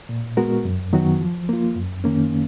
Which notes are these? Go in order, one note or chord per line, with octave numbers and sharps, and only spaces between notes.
A#2
G#3 B3 F#4 A#4
F#2
D#3 F#3 B3 F#4
F3
A#3 F4
F#2
D#3 A#3 C#4